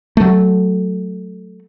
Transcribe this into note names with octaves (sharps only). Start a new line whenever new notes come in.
F#3 A3